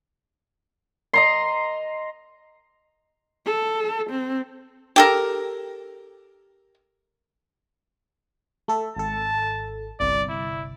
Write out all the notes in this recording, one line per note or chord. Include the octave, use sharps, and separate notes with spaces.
D#5 A#5 C6
A4
C4
G4 A4 A#4
A3 A4 E5
G#1 A4 A5
G1 C2 D5
E4